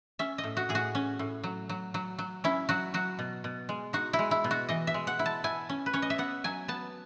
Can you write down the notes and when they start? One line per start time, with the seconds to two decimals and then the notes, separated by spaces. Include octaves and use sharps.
0.19 C#4 E5
0.38 D#5
0.44 A2
0.57 F#4
0.69 A2 G#4
0.75 F#4
0.95 C#4
1.19 A2
1.44 F#3
1.69 F#3
1.94 F#3
2.19 F#3
2.44 C#4 E4
2.69 F#3 F#4
2.94 F#3 F#4
3.19 B2
3.44 B2
3.69 G#3
3.93 D#4 F#4
4.13 E4
4.19 G#3
4.31 E4
4.44 B2
4.51 F#4
4.69 E3 D#5
4.87 E5
4.94 G#3
5.07 F#5
5.19 E4
5.26 A5
5.44 E4 G#5
5.69 C#4
5.86 B4
5.93 C#4 C#5
6.02 D#5
6.10 E5
6.18 B3 F#5
6.44 F#3 G#5
6.68 B3 A5